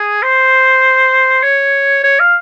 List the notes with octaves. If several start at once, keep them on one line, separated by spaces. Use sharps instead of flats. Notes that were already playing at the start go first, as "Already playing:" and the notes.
Already playing: G#4
C5
C#5
C#5
F5